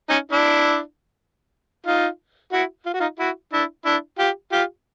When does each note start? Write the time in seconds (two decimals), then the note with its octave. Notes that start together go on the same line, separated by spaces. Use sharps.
0.09 C#4 D#4
0.32 D4 E4
1.86 D#4 F4
2.52 E4 F#4
2.86 F4
2.94 F#4
3.00 D#4 F4
3.19 E4 F#4
3.53 D4 E4
3.85 D4 E4
4.18 F4 G4
4.52 F4 G4